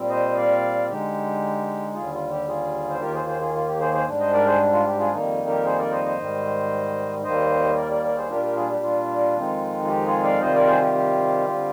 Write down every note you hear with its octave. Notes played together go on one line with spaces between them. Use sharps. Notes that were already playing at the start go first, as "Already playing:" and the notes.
Already playing: A#2 G3 C4
C5 D#5
D5 F5
D3 G#3 D#4 G4
D#2 D3 G3 F4 G#4
F4
G4
F4 G#4
C5
D#2 D#3 A#3 F4 G4 A#4
G#4 C5
G#4 C5
F4 G#4
F4
G4
G#4 C5
G#4 C5
G#2 G3 D4
C5 D#5
A#4 D5
G#4 C5
F4
G4
F4 G#4
F2 D#3 G3 A#3 D#4
G4 A#4
G#4 C5
A#4 D5
C5 D#5
C5 D#5
G#2 D#3 G3
D#2 D#3 G3 A#3 C5 D#5
A#4 D5
A#4 D5
A#4 D5
G#4 C5
A#2 G3 D4 F4 G4 A#4
G4 A#4
F4 G#4
G4
F4
F2 D#3 G#3 C4 D#4
F4
G4
F4 G#4
D5 F5
C3 D#3 G3 C4 F4 C5 D#5
A#4 D5
G#4 C5
G4
G4
D3 G3 C4 F4